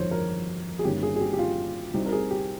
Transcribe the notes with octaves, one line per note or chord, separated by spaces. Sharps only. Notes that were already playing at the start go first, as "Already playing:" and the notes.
Already playing: G1 F2 D#3 G#3 C5 C#5
A#4
G#4
G1 G2 D#3 A#3 C#4 G4
G#4
G#4
G4
G4
F4
C2 C3 G3 C4 D#4 G4
A#4
G#4
G4